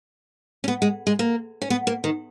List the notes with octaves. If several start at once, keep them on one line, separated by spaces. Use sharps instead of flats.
C#4
B3
G#3
G#3
A#3
C#4
B3
A#3
D#3